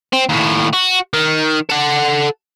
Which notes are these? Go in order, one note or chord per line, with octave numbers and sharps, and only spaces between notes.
C4
D#2 A2
F#4
D#3
A4 F#5